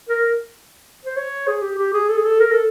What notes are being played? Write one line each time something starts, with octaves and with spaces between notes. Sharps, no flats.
A#4
C5
C#5
G#4
G4
G4
G#4
A4
G#4
A4
A#4
A4